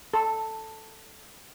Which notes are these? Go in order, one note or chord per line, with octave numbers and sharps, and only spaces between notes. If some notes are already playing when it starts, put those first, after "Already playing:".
A4